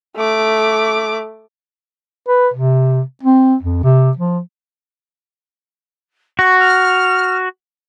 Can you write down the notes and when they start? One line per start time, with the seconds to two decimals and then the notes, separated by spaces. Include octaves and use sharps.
0.16 A3 D6
2.28 B4
2.54 C3
3.23 C4
3.62 F2
3.83 C3
4.17 F3
6.39 F#4 C#6
6.59 F6